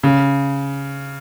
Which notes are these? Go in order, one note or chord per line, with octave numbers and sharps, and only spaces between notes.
C#3